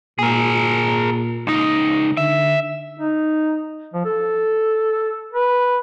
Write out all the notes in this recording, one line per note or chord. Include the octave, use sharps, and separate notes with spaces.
A#2 G#4 A#4
C#2 D#4
D3 E5
D#4
F3
A4
B4